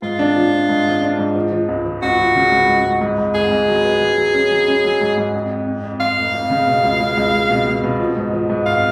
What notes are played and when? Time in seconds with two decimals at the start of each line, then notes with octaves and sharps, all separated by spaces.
0.02 G#2 F4
0.19 D4
0.36 F3
0.53 D4
0.69 G#2
0.86 F3
1.02 D4
1.18 G#2
1.35 F3
1.52 F3
1.69 C#2
1.85 F3
2.02 C#2 F#4
2.19 F3
2.35 C#3
2.51 C#2
2.68 G#2
2.85 G#2
3.01 G#2
3.18 G#2
3.35 G#1 G#4
3.51 G#2
3.68 F#3
3.84 B3
4.02 F#3
4.18 F#3
4.34 C#4
4.51 F#3
4.68 C#4
4.85 F#3
5.01 G#2
5.17 G#2
5.34 F2
5.50 F2
5.67 F2
5.84 F2
6.00 F2 F5
6.17 F1
6.34 F2
6.50 C#3
6.67 B2
6.84 C#2
7.00 G#3
7.17 C#2
7.33 G#3
7.50 B2
7.67 B2
7.83 B2
8.00 F3
8.17 G#2
8.33 F3
8.50 G#2
8.66 G#1 F5